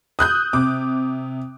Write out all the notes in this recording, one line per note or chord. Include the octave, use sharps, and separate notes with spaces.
D#6 F#6 G6
C3 D6